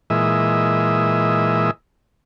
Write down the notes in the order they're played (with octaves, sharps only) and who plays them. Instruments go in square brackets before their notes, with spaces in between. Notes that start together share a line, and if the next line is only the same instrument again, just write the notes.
[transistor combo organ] A#2 E3 G#3 D#5 E5